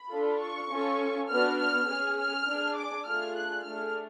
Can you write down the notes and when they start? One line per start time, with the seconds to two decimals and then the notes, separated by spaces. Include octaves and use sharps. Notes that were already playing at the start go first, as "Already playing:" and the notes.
Already playing: B5
0.11 D4 F4 A4
0.40 C#6
0.70 C#4 F4 A4
1.30 B3 D4 F#4 F6
1.59 F6
1.88 C#4 G#4 F6
2.19 F6
2.47 D4 G#4
2.77 D6
3.06 A3 D4 F4 G#4 F6
3.36 F#6
3.65 A3 D4 G#4 F6